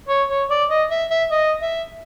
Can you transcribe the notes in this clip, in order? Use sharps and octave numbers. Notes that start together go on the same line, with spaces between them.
C#5
C#5
D5
D#5
E5
E5
D#5
E5